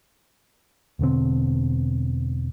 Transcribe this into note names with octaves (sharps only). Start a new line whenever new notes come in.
E1 B2 D3 C4